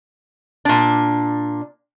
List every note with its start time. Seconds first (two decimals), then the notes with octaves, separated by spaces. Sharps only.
0.65 A#2 D4